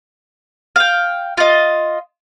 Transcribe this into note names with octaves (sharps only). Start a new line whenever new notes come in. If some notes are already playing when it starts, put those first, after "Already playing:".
F5 G5
F4 D#5